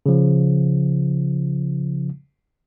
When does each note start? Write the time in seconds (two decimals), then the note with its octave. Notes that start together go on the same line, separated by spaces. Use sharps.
0.06 C#3 F3